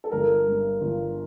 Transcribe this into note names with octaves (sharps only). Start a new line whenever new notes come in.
A4
G1 A#4
G2
G1